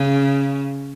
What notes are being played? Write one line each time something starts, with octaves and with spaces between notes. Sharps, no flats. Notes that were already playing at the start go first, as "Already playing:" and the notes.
Already playing: C#3